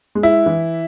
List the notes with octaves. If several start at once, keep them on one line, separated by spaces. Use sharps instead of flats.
G#3
E4
E3